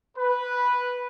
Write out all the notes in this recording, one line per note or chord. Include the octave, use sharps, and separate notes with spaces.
B4